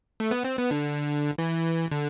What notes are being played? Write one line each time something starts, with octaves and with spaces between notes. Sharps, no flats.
A3
B3
C4
B3
D3
E3
D3